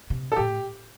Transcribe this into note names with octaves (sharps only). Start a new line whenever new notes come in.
C3
A4
A2 G4